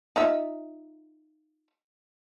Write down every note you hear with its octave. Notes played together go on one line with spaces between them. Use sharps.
D#4 F4 E5